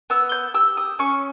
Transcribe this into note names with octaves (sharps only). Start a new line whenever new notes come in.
B3 E6
G6
G4 E6
D#6
C#4 C#6